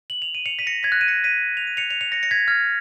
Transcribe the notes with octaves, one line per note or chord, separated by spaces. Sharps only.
F#7
F7
D#7
C#7 F7
B6 D#7
A#6 C#7
G#6 B6
F#6 A#6
D#7
A#6 C#7
B6 D#7
F7
D#7
C#7 F7
C#7 F7
C#7 F7
A#6 C#7
A#6 C#7
G#6 B6
F6 G#6